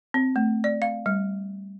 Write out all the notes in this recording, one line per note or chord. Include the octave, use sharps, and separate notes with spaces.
C4
A3
D5
F5
G3